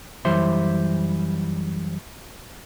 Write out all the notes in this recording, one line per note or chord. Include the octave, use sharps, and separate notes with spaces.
F#2 E3 G3 C5 E5 C6